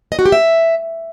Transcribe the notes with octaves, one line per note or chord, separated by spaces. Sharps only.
D#5
F#4
G4
E5